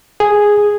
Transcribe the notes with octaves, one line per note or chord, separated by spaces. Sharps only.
G#4